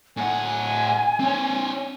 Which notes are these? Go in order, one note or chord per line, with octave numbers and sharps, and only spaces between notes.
A2 F#5 G#5
C4 C#5